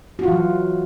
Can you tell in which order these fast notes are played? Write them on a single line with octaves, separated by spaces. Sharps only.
F#4 F4 E3 F#3